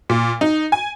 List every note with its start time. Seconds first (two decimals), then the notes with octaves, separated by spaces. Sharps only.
0.09 A#2
0.41 D#4
0.72 G#5